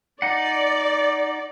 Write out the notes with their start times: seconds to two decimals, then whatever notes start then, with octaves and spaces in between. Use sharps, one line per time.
0.22 D#4 D5 F#5